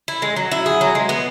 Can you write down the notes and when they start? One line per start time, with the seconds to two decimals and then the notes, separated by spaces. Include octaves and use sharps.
0.08 E4
0.22 G#3
0.36 F#3
0.52 E4
0.66 G#4
0.81 F#3
0.95 G#3
1.09 B3